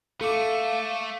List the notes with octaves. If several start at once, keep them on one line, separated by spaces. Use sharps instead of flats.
A3 A4 F5 D6 C#7 D#7